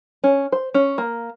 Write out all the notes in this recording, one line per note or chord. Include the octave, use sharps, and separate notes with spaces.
C#4
C5
C#4
A#3